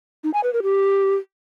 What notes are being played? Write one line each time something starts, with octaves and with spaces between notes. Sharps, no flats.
D#4
G#5
B4
A#4
G4